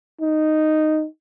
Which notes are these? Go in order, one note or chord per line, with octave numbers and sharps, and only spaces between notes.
D#4